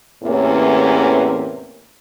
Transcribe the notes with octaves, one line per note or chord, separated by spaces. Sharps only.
E2 A2 C3 E3 A#3 C#4